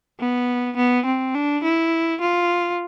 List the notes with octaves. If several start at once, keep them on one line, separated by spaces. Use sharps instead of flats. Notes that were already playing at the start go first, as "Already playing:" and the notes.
B3
B3
C4
D4
E4
F4